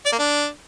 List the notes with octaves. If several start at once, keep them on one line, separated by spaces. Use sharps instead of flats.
D5
A#3
D4